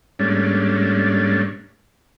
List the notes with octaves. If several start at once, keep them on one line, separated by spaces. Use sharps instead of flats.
G#2 G3 A3 A#3 C#4 D4